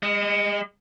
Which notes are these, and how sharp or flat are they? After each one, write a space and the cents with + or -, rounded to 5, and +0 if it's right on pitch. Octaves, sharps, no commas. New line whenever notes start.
G#3 -40 D#5 +0